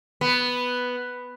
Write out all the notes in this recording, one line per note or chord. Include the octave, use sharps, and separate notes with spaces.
B3